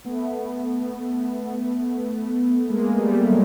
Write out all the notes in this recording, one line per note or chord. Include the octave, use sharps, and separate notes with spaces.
A3 B3
G#3 A#3
G3 A3
F#3 G#3